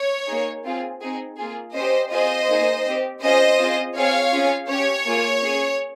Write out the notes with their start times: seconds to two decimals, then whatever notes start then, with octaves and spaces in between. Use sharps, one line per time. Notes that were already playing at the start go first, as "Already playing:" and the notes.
Already playing: C#5
0.28 A#3 D#4 G#4
0.64 C4 F4 G#4
1.01 C4 D#4 G#4
1.38 A#3 F4 G#4
1.75 C#4 G4 C5 D#5
2.11 C4 F4 G#4 C5 D#5
2.48 A#3 D#4 G#4
2.85 C4 G4
3.22 C#4 F4 G#4 C5 D#5
3.59 C4 F4 G#4
3.95 C4 F4 G#4 C#5 F5
4.33 C#4 F4 G#4
4.69 C#4 G4 C#5
5.06 A#3 F4 G#4
5.43 C#4 G#4